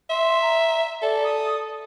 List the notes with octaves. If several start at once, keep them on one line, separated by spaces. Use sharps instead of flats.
E5 C6
A#5
A4 D5
D#6